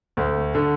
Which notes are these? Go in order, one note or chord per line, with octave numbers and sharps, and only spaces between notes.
D2
D3